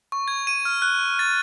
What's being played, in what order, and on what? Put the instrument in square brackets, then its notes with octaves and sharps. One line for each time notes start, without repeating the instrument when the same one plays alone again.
[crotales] C#6
G#6
D#7
F6
F#6
A6